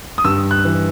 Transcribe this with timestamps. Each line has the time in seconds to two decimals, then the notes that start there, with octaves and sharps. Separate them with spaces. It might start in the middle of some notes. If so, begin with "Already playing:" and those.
0.18 D#6
0.24 G2 E6
0.51 F#6
0.65 E3